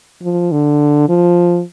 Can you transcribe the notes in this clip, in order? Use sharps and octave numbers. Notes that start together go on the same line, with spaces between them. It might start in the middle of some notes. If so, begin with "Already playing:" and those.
F3
D3
F3